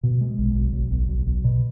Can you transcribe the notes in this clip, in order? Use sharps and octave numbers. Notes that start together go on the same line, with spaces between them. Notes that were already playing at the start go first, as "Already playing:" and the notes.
B2
G#3
B1
B1
B1
B1
B1
B1
B2